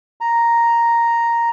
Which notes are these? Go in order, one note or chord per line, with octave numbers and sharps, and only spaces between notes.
A#5